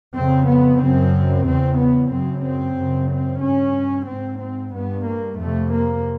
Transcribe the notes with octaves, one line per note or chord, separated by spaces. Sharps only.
F2 C#3 C4
B3
F#2 C#3 C4
E2 C#3 C4
B3
F#2 C#3 C4
C4
F#2 C#3
C4
G2 C#4
G#2 C4
C4
G2 B3
A#3
F2 C3 A3
A#3